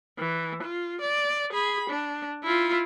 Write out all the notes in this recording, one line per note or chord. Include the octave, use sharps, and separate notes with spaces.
E3
F4
D5
G#4 B5
D4
E4 F4